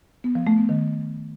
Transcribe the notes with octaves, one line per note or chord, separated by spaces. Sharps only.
B3
F3
A3
B3
D#3